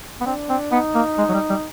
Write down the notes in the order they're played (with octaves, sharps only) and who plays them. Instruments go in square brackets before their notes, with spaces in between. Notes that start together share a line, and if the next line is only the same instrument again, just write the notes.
[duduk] B3
[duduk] C4 [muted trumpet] D4
[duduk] C4
[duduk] B3 [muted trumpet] D#4
[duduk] A#3
G#3
F#3
G3
G3